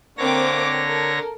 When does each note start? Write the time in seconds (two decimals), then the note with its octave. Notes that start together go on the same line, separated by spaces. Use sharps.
0.18 D3 A#3 C4 C#5 D6 A#6
0.86 A4 A#4